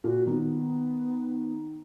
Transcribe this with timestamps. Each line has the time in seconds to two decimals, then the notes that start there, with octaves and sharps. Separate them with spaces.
0.04 A#2 F#4
0.27 D#3 B3